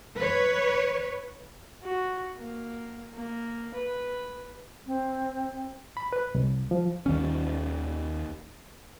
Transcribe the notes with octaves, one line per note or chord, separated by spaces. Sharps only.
B4 C#5
F#4
A#3
A#3
B4
C4
B5
B4
C2
F3
D#2 D#3 C#4